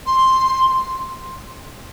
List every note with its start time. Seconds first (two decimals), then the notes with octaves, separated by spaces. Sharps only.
0.06 C6